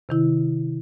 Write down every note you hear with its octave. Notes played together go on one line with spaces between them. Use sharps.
C3 D#3 E4